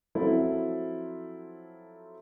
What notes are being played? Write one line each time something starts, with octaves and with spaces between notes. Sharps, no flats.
F3 F#3 C4 E4 F4 A4